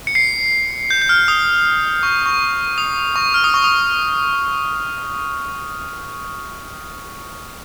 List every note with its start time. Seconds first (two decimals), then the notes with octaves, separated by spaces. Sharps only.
0.07 C#7
0.15 C7
0.90 G6
1.02 G6
1.09 F6
1.28 D#6
2.03 C#6
2.26 C#6
2.78 D#6
3.16 C#6
3.34 F6
3.44 D#6
3.54 C#6
3.64 D#6